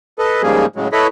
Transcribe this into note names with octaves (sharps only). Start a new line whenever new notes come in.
A4 B4 D#5
G#2 C#3 F3 G3 A#3 G#4
A2 C#3 F#3 G#3
E4 A4 B4 C#5 D#5 B5